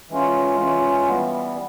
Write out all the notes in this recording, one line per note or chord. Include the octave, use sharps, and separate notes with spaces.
E3 G#3 C#4 F4
E3 G#3 C#4 F4
E3 G3 B3